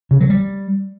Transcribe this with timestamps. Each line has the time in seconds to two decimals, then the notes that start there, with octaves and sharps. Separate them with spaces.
0.11 C#3
0.20 F#3
0.30 G3